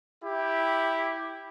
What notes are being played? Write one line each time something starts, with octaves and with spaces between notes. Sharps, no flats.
E4 G4